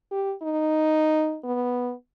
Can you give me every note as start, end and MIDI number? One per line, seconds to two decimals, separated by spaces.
0.11 0.33 67
0.42 1.37 63
1.44 1.92 59